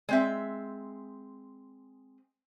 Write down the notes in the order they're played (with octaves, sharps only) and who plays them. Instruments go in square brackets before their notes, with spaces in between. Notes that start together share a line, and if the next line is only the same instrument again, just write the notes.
[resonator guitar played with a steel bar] G#3 C4 E5